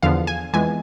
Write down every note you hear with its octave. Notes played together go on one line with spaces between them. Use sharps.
E2 D3 F3 B3 F5
G#5
F2 E3 G#3 B3 G#5